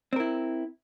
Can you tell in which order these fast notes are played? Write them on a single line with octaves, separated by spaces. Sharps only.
C4 A#4 E4